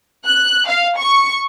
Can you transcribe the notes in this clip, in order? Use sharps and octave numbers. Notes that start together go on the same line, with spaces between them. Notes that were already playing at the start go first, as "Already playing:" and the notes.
F#6
F5
C#6